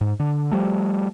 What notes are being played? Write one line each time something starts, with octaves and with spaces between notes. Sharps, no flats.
G#2
D3
F3 G3 A3